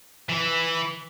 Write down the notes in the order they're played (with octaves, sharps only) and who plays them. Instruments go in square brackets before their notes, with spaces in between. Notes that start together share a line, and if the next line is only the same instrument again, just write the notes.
[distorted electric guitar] E3